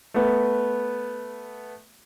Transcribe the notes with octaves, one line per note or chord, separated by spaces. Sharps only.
A3 B3